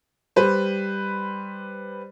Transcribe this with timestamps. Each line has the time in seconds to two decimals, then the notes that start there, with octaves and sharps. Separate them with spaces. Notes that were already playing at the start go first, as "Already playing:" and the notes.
0.36 G3 B4 C5